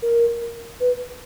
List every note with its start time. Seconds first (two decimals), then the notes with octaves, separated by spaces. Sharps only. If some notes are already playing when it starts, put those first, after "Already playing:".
0.02 A#4
0.80 B4